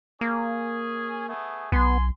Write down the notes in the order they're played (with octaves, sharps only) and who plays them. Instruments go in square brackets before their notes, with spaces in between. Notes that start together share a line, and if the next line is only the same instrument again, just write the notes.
[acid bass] A#3 [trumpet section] C#4 G#4
[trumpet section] A3 B3 G#4
[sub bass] B1 [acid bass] B3 [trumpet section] G#5 C6